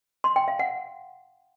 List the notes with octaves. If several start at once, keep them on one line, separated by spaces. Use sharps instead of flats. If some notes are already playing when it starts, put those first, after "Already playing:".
C6
G5
F5
F#5